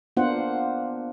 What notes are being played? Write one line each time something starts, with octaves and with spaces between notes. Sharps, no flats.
A#3 B3 D4 F4 C5 F#5